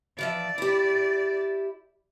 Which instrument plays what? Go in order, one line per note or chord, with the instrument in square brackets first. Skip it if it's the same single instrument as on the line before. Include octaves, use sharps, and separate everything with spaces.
[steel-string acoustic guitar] E3 F3 E5 [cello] D5
[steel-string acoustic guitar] E4 G4